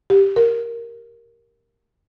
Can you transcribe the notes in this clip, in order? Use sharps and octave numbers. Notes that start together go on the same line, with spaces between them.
G4
A#4